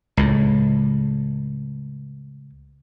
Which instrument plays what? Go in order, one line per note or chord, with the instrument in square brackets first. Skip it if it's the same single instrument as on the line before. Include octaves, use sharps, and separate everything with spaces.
[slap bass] C#2 A2